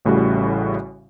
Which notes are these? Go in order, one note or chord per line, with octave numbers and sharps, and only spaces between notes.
A1 A2 C#3 G3 F#4